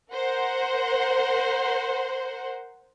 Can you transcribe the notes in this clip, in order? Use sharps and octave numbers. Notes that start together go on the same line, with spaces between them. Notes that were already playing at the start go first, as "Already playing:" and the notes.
A#4 C5 F#5